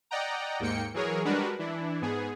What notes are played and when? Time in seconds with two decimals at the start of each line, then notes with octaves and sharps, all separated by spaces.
0.11 D5 D#5 F#5 G5 A#5
0.60 D#2 G#2 A#3 G5 C#7
0.94 E3 F#3 G#4 A#4 C#5
1.25 G3 G#3 D4 F#4 A#4 B4
1.59 E3 D4 E4
2.01 G#2 B3 G#4